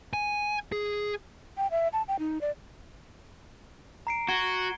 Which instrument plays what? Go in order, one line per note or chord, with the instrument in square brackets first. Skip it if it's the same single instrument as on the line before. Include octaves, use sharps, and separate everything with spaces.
[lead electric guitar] G#5
G#4
[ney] G5
E5
A5
G5
D#4
D5
[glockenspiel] A#5 C7 D7
[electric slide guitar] F#4 [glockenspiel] G#6 C#7 G7